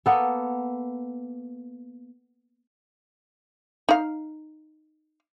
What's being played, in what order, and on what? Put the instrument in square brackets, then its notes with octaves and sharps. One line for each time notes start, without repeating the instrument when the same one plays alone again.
[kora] A#3 B3 A4
[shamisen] D#4 F5